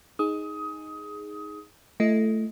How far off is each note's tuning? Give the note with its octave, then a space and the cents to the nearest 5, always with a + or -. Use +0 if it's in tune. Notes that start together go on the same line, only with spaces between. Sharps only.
D#4 +5 G#4 +0 D#6 +20
A3 +0 E4 +45 D#5 +15